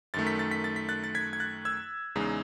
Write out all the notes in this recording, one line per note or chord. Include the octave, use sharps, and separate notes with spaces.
F#2 D#3 A3 A6
B6
A6
B6
A6
B6
F#6 A6
A6
G#6 B6
G#6
F#6 A6
E6 G#6
E2 C#3 G#3 D#4